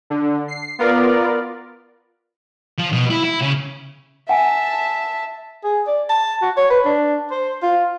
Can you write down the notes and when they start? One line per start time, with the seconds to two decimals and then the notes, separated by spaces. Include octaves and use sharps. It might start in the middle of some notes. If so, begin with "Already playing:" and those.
0.10 D3
0.48 C7
0.79 B3 F4 A#4 D5
2.78 F3
2.92 B2
3.10 E4
3.24 E4
3.41 C#3
4.29 E5 F#5 G#5 A5
5.64 G#4
5.87 D5
6.09 A5
6.42 F#4
6.57 C#5
6.70 B4
6.86 D4
7.31 C5
7.63 F4